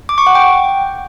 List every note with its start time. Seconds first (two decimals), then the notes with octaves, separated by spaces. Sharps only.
0.09 D6
0.18 C#6
0.27 F#5
0.35 G5